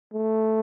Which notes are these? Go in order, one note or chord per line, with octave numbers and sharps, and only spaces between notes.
A3